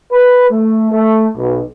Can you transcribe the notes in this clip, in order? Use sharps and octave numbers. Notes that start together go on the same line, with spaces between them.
B4
A3
A3
B1